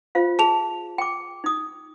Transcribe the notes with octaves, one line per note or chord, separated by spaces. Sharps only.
F4 C5 F5
G#4 A5 F7
G5 D6
D#4 D#6